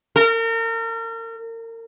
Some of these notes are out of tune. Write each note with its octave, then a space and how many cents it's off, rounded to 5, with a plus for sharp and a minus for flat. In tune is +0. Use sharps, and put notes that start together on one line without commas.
A#4 -35